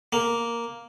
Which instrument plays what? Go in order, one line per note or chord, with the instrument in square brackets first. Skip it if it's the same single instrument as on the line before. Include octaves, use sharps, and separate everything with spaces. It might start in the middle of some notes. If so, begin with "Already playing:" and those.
[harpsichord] A#3